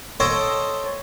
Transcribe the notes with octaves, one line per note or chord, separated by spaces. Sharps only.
A4 C5 C#5 D#5 G5 A5